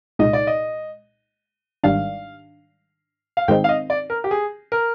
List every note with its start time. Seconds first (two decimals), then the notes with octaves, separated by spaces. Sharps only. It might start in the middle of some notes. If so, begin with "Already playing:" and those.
0.19 C2 A#2 G#3 D#4 D#5
0.33 D5
0.47 D#5
1.84 G#1 G#2 D#3 G3 D4 F5
3.37 F5
3.48 G#2 D#3 G#3 C4 D#4 G5
3.64 F5
3.69 D#5
3.90 D5
4.10 A#4
4.24 G4
4.31 G#4
4.72 A#4